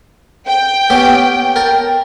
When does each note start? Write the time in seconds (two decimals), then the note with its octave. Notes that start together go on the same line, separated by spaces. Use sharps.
0.47 G5
0.90 B3 C#4 G4
1.56 A#4 G5 A5